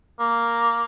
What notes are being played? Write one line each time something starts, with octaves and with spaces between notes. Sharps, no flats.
A#3